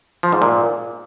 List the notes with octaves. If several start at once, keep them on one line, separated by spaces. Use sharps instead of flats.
F3
G#2
A#2